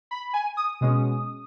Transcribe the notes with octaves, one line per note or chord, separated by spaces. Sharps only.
B5
G#5
D#6
B2 G#3 C#4